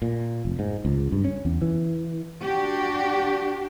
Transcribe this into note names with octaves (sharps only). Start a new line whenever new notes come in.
A#2
F1
G#2
C#2
G2
C#4
E2
E3
D4 F#4 G4